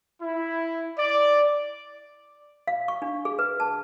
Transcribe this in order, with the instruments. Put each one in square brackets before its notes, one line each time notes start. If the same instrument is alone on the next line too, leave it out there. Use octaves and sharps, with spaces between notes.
[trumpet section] E4
D5
[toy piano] F5
C#6
D4
G#4
B4
A5